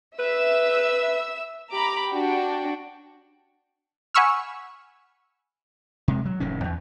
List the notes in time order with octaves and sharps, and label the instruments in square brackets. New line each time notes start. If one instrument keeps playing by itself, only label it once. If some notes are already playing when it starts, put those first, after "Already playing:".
[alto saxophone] B4 [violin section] E5 E6
[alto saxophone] G4 [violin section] A#5 B5 D6
[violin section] D4 F#4 G5
[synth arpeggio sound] F#5 G#5 B5 C#6 E6 F6
[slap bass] C3 G#3
F#3
F1 A2 D#3 C#4
E2